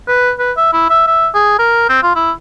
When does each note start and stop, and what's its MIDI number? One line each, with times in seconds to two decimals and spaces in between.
0.08 0.32 71
0.39 0.52 71
0.57 0.70 76
0.73 0.87 64
0.90 1.02 76
1.07 1.28 76
1.35 1.54 68
1.59 1.89 70
1.89 1.98 60
2.03 2.13 65
2.16 2.31 64